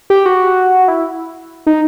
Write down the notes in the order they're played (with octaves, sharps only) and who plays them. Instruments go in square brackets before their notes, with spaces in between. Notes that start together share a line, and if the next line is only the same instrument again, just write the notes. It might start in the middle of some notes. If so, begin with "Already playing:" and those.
[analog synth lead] G4
F#4
E4
D#4